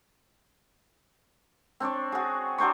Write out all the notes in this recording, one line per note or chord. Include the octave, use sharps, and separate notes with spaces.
C4 D4 C#5 D5
F#4 G#4
F#3 D4 C5 C#6